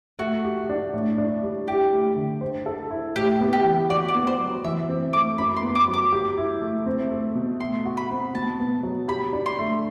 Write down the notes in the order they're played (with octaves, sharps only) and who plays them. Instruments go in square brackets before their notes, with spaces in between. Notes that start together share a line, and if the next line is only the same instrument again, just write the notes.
[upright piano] A3 [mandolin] F#4
[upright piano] G4
D4
A2
D4
G3
[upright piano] E4 [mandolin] G4
[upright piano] A3
D3
C5
A4
E4
[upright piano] A2 [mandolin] G4
[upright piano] B3
[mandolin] G4
[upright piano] E3
[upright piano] F#4 [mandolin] D5
[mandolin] D5
[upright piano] B3
[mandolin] C5
[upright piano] F#3
[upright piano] E3 [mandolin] E5
[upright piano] C4
[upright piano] A3 [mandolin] D6
[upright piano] F#2 [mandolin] B5
[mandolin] C6
[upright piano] B3
[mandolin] D6
[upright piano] F#3
[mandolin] D6
[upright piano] G4
E4
A3
C4
A3
B2
[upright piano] A3 [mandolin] C6
[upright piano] F#4
[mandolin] B5
[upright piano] C4
[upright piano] B2 [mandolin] A5
[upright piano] B3
F#3
[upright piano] G4 [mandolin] B5
[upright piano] D4
[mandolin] C6
[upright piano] A3